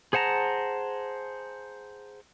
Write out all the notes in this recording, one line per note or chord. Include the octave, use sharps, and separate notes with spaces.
G#4 C5 F#5 A5 A#5